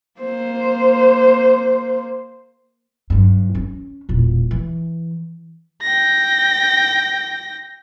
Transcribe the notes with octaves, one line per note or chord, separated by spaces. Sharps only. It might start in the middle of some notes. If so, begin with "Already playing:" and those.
A#3 C5
G2 F#3
C#4
E1 A#2
E3
G5 A#6